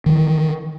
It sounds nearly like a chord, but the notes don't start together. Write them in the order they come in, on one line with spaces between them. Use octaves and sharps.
D#3 F#3 E3